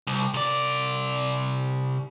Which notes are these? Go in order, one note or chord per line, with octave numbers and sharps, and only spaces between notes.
C2
C3 D5